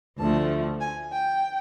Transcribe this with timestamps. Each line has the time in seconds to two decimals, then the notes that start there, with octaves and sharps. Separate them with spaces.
0.18 D2 D3 F3 A3 A5
0.81 G#5
1.12 G5